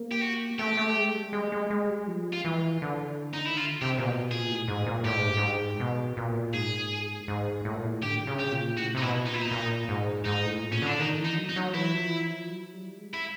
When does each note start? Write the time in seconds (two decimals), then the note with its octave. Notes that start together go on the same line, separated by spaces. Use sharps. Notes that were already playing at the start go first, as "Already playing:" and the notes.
Already playing: A#3
0.12 G4
0.22 F#4
0.59 A3 G4
0.77 A3
0.97 G#3
1.15 G3
1.33 G#3
1.52 G#3
1.70 G#3
1.89 G3
2.08 F3
2.33 F4
2.45 E3
2.82 D3
3.33 D#4
3.45 D#3 E4
3.56 D3 F4
3.82 C3 G4
3.98 A#2
4.06 B2
4.30 A#2 G#4
4.49 A2
4.68 G#2
4.86 A#2
5.05 A2 G4
5.16 G#2
5.27 G2
5.37 G#2
5.80 B2
6.17 A#2
6.53 G#2 G#4
7.28 G#2
7.65 A2
7.75 A#2
7.85 A2
8.03 D3 G4
8.27 C#3
8.40 G4
8.52 A#2
8.77 A2 F#4
8.95 C3
8.97 D#4
9.02 B2 E4
9.26 A#2 D#4
9.34 E4
9.42 D#4
9.51 A#2
9.89 G#2
10.26 G#2 D#4
10.45 A2
10.63 A#2
10.72 C#4
10.82 D3 D4
10.99 D#3 D#4
11.19 E3
11.24 D#4
11.38 F#3
11.49 D#4
11.56 F#3
11.74 E3 E4
11.93 F3
12.11 E3
12.30 F3
12.48 F#3
12.73 G3
12.98 G#3
13.14 E4